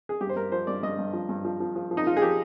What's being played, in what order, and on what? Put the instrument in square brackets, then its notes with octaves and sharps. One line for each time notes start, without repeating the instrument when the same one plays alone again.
[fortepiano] G#4
G2 G4
C5
G2 A#4
F3 C5
G2 D5
G2 D#5
G2
F3
G2
F3
F3
F3
F3
D#4
F3 F4
G#4
F3 G4